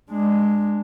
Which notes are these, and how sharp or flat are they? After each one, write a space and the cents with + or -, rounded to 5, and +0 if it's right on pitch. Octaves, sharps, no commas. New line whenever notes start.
G#3 +0 D4 +10